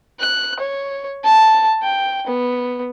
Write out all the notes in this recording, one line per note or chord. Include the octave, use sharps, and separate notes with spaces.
F#6
C#5
A5
G5
B3